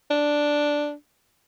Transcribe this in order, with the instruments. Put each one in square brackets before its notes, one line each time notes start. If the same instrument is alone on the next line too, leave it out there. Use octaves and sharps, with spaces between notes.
[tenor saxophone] D4